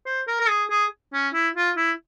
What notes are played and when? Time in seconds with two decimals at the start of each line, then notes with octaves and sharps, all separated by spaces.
0.06 C5
0.28 A#4
0.40 A#4
0.49 G#4
0.70 G#4
1.13 C#4
1.34 E4
1.56 F4
1.77 E4